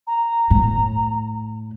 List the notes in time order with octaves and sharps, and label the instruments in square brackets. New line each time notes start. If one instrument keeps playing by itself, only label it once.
[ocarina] A#5
[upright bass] A2